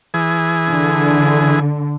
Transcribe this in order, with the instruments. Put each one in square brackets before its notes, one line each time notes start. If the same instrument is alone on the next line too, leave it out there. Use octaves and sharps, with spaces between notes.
[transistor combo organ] E3 G#4
[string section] D3